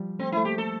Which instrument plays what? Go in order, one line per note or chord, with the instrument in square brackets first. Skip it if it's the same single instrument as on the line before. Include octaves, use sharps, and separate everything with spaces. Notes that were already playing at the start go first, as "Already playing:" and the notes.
Already playing: [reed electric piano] F3 G3
[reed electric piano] A3 [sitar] C4
[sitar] E4
[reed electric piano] A3
[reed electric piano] A#3 [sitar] G4
[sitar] A4